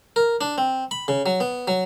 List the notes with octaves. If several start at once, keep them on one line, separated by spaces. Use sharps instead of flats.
A#4
D4
C4
B5
C#3
F#3
B3
F#3